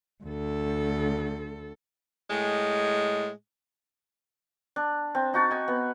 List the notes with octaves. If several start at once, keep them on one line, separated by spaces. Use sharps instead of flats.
D2 A4
A2 G#3
D4
C4
D#4 F#4 A5
D#4 G#5
B3